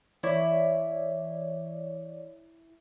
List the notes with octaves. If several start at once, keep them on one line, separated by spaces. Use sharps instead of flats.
E3 E4 C#5 D5